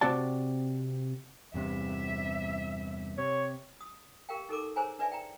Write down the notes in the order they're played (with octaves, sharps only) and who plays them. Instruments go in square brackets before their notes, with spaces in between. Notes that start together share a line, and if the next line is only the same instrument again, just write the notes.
[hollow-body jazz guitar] C3 C4 F#4 D5 A5
[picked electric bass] E2 G2 C3 [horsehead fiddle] E5
[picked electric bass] C3 [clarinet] C#5
[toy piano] D#6
G4 A#4 F5 G5
D#4 A4 A#4 D6
G#4 A#4 C5 C#5 G#5 A#5
D4 B4 D5 E5 G#5 A5
G5 A#5